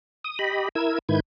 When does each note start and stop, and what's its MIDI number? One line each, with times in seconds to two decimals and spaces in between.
0.24 0.39 87
0.39 0.69 67
0.39 0.69 75
0.39 0.69 83
0.75 0.99 64
0.75 0.99 70
0.75 0.99 88
0.75 0.99 92
1.09 1.20 44
1.09 1.20 51
1.09 1.20 64
1.09 1.20 71
1.09 1.20 91
1.09 1.20 92